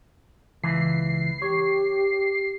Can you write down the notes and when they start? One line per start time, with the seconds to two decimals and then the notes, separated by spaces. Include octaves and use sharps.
0.63 C#2 E3 C7
1.42 G4 C#5